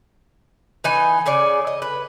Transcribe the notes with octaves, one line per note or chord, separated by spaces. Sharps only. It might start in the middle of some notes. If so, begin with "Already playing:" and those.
E3 D#4 G#5
C#3 G#4 C#5 D5
D#5
B4